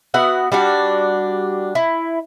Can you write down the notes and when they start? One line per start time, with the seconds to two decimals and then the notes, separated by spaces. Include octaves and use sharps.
0.14 B3 F#4 E5 F#5
0.52 G3 D4 F#4
1.75 E4